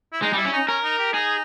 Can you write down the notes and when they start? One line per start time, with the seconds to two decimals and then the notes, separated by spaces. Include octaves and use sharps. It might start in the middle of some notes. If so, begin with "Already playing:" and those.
0.13 E4
0.22 G#3 D#4
0.33 G3 E4
0.45 C#4
0.53 D#4
0.68 C#4 A#4
0.84 D#4
0.99 G4
1.13 D#4 G#4